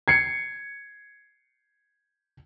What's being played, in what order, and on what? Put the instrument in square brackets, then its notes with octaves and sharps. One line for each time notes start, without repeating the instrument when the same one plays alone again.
[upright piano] G#6 C7 C#7